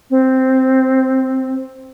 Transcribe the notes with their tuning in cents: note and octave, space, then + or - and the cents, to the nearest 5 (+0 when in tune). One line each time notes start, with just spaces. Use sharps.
C4 +0